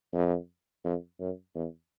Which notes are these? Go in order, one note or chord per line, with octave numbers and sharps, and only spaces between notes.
F2
F2
F#2
E2